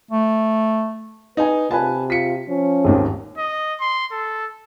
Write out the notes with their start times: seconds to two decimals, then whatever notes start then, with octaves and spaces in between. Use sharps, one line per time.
0.11 A3
1.37 D#4 B4 G#5
1.71 C3 F4 B4 G#5 A5
2.10 F4 B6 C#7
2.49 F3 C#4
2.85 G#1 D#2 D#3
3.38 D#5
3.81 C6
4.12 A4